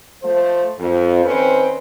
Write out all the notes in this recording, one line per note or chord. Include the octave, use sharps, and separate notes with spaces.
F3 A3 C5
F2
D#3 C4 C#4 B4